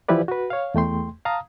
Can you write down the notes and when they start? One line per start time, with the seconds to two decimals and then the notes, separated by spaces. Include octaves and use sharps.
0.09 E3 F3 E4 G4 B4 D5
0.28 F#4 B4
0.50 C#5 F5
0.74 E2 A3 G5 C6
1.25 F5 A5 A#5 D#6